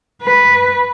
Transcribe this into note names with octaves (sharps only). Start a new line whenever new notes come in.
B4